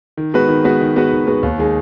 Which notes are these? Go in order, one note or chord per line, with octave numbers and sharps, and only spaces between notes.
D#3
G#3 B3 F#4 B4
D#3
G#3 B3 F#4 B4
D#3
G#3 B3 F#4 B4
D#3
G#3 B3 F#4 B4
D#2
D#3 G#3 D#4 G#4